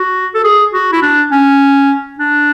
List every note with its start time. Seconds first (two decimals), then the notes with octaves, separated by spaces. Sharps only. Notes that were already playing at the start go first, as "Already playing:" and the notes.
Already playing: F#4
0.35 A4
0.44 G#4
0.74 F#4
0.92 E4
1.02 D4
1.32 C#4
2.19 D4